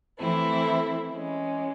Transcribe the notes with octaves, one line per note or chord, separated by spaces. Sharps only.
E3 A3 C4 E4
E3 G#3 C#4